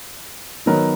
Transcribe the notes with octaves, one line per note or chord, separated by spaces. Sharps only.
D#3 F#3 B3 D#4 A#4